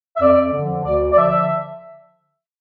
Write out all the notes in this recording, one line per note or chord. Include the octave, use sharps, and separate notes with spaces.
E5
F2 D5
D3 F3
D2 D5
D5
D3 F3 E5